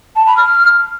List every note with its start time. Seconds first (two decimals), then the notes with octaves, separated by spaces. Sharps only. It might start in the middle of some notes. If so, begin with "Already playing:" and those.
0.15 A5
0.26 B5
0.36 F6